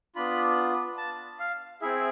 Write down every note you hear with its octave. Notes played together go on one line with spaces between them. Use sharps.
B3 D4 F4 B5
A5
F5
C4 E4 G#4 E5